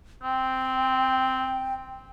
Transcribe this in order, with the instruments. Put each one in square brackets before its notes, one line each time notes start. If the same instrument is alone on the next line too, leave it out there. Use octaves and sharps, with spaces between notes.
[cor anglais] C4 [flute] G5